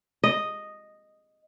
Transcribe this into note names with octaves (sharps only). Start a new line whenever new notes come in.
D#5